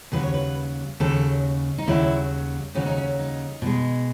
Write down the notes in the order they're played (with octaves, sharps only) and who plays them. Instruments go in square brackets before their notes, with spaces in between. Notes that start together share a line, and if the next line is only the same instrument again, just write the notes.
[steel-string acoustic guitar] D#2 C#3 F#3 B4
C#5
B4
D#2 C#3 F#3 A4
D#4
D#2 C#3 F#3 E4
D#2 C#3 F#3 C#4
D#4
C#4
D#4
B2 G#3